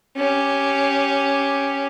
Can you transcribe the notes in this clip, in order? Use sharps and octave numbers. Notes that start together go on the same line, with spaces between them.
C#4 G4